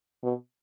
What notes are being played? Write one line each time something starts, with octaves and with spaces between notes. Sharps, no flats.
B2